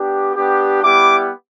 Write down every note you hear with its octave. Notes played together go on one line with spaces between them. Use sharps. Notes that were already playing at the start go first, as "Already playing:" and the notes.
Already playing: B3 D4 G4
B3 D4 G4
G3 B3 E4 G4 D6